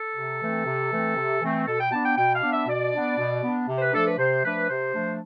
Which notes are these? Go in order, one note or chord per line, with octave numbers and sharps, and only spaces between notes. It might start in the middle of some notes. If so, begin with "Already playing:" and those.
Already playing: A4
C3
E3 A3 C4
C3
E3 A3 C4
C3
E3 A3 C4
B2 A4
G5
B3 D4 A5
G5
B2 G5
F5
B3 D4
E5
B2 D5
B3 D4
B2
B3 D4
C3
C5
B4
F3 A3 D4 A4
B4
C3 C5
F3 A3 D4 B4
C3 C5
F3 A3 D4